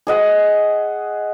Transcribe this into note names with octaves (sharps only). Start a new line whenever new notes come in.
G#4 D#5 F#5